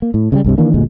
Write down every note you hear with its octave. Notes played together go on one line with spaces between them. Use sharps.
A#3
A2
C#3 E3 G3
C2 G2 C3
D#3 E3 A#3 D4
G1 D2 A#2 G#3